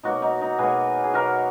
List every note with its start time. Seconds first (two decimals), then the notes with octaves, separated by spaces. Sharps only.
0.03 B2 F#3 A#3 D#4 F#4
0.22 D#4
0.41 D#4
0.59 B2 F#3 A#3 G#4 B4
1.04 G#4
1.14 B2 F#3 A#3 F#4 A#4